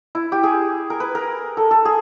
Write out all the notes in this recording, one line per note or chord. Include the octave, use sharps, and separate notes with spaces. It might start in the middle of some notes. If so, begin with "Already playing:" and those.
E4
G4
G#4
A#4
B4
A#4
A4
A4
G#4